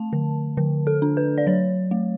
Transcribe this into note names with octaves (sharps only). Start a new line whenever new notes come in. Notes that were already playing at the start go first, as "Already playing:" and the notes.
Already playing: A3 A5
D3
D3
A4
D4
B4
D5
F#3 C#5
A3